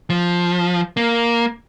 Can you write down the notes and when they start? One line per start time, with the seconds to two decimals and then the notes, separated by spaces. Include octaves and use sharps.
0.10 F3
0.97 A#3